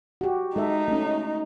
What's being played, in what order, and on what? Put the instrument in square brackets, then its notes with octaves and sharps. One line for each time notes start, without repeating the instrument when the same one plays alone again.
[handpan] F#4 G4
[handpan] G#3 A4 E5 [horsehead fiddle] D#4
[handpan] A3 C#4